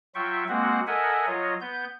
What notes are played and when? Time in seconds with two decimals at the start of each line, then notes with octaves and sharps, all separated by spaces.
0.15 F#3 F4 E5 G5 C#6
0.49 G#3 A#3 C4 F#4 F#5
0.87 A4 A#4 D#5 E5 F#5 G#5
1.27 F#3 F4 C#5 D#5
1.61 B3 G6